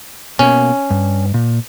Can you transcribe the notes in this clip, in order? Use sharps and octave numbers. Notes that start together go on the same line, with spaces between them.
B2 A#3 C#4
G2
A#2